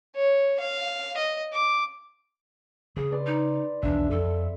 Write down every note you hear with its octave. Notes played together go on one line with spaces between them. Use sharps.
C#5
F5
D#5
D6
C#3 G#4
B4 D5 C6
D#4
B1 E2 D#3 D4 E5
F2 A4